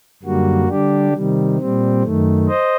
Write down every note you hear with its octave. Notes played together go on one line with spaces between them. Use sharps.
F#2 D3 G3 A#3 F#4
D3 G3 D4 G4
C3 D#3 G3
A#2 G3 C4
F#2 D#3 A3
C5 D#5